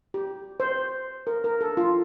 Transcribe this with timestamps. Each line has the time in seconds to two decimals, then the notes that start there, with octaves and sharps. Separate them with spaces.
0.14 G4
0.60 C5
1.27 A#4
1.44 A#4
1.61 A4
1.77 F4